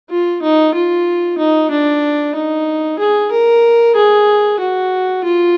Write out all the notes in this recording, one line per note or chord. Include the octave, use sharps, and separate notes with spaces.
F4
D#4
F4
D#4
D4
D#4
G#4
A#4
G#4
F#4
F4